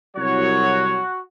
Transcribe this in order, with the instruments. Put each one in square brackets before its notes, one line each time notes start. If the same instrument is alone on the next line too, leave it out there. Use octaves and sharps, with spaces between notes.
[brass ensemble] C2 F#3 C#5 [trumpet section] F#4